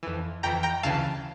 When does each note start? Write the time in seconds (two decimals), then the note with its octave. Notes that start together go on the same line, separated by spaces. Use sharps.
0.03 F2 E3
0.43 F2 E3 G5 A#5
0.63 G5 A#5
0.83 D2 C#3 E3 F5 A5